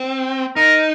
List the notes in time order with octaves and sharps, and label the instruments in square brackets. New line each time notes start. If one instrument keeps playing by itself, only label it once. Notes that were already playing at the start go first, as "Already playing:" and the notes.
Already playing: [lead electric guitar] C4
[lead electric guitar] D#4 [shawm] A#4